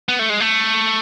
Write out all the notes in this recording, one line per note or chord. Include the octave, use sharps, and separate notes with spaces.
B3
A3
G#3
A3